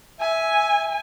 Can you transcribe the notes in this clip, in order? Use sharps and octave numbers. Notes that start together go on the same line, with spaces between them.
E5 G#5